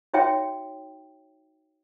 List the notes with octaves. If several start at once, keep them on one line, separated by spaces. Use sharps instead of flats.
D#4 F#4 C#5 E5 G5